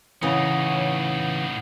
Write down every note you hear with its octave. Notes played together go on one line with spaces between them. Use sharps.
A2 C#3 E3 D#4 C#5 F#5 D#6